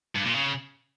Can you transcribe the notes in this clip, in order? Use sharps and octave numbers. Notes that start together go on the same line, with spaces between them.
G2
A#2
C#3